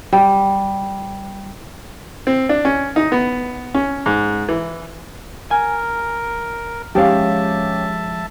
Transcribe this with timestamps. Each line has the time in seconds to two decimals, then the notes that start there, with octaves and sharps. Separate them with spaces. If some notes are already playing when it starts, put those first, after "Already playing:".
0.13 G3
2.27 C4
2.49 D4
2.65 C#4
2.96 D#4
3.12 B3
3.74 C#4
4.06 G#2
4.49 E3
5.51 A#4 G#5
6.95 F3 G#3 C#4 G4 E5 F5 A5